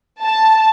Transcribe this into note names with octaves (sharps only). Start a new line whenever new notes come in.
A5